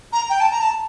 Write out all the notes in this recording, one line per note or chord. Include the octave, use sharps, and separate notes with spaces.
A#5
G5
A5
A#5
A5